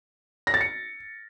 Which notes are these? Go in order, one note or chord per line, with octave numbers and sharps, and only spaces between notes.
A#6
A6
C#7